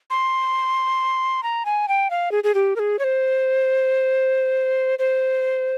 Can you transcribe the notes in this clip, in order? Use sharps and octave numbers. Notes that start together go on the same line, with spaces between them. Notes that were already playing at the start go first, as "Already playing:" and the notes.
C6
A#5
G#5
G5
F5
G#4
G#4
G4
A#4
G#4
C#5
C5
C5